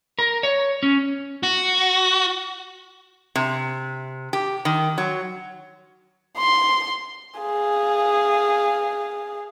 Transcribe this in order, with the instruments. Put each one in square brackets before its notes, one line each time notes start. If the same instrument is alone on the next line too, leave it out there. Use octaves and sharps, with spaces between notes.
[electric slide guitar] A#4
C#5
C#4
[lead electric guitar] F#4
[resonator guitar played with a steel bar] C3
G4
D#3
F#3
[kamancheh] C6
G#4 F5